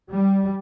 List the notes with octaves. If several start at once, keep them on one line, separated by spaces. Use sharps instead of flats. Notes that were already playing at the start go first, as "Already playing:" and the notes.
G3